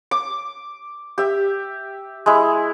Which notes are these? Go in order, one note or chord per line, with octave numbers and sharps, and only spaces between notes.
D6
G4 E5
G#3 E4